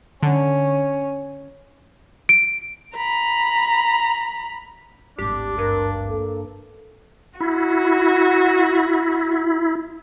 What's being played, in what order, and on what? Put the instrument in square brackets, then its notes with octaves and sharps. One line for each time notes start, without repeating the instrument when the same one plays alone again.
[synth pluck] D3 [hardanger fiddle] C#4
[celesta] D7
[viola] A#5 B5
[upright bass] D1 G#1 [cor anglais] D4 [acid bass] G4
[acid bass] G2 [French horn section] A#4
[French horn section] A#3 A4
[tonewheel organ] E4 [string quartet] F#4